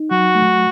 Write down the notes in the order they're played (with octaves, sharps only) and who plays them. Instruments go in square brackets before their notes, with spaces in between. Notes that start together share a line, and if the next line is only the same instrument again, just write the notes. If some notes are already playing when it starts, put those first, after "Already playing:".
Already playing: [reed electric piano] D#4
[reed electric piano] F#3 [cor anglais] F#4
[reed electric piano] A3